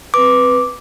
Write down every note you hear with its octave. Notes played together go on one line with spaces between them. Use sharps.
C4 B4 D6